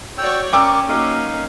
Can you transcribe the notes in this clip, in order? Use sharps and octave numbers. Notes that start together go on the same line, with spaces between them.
F#4 C#5 D5 G5 E6
C#4 A#4 D5 G5 C#6 D6 E6
F#3 A#3 C#4 D#4 F5